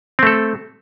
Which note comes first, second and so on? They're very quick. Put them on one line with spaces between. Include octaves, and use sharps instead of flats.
C4 A3 A4